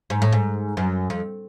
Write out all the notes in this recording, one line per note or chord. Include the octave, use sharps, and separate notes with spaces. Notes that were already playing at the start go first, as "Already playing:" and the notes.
G#2
A2
G#2
F#2
F2